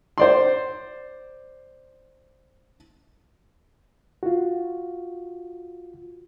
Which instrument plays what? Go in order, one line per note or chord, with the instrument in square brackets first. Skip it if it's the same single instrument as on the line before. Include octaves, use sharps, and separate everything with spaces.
[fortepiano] C5 D5 C6
[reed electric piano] F4 F#4